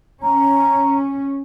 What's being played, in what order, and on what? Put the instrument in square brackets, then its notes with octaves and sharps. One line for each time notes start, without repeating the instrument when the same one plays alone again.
[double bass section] C#4 [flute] A#5